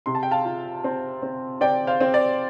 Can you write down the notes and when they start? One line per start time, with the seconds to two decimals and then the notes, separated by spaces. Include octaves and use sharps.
0.06 C3 C6
0.15 A5
0.23 G5
0.31 F5 A5
0.45 F4
0.84 C4
1.22 C4
1.61 C4 D5 G5
1.87 C5 F5
2.00 C4
2.14 D5